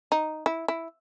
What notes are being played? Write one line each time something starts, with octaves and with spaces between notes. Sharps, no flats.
D#4
E4
E4